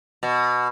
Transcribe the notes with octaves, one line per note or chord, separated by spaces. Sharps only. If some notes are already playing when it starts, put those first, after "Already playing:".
B2